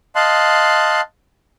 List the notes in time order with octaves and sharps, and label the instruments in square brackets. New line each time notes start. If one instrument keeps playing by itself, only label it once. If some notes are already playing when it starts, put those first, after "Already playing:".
[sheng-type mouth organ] D#5 F5 A5 C6 F#6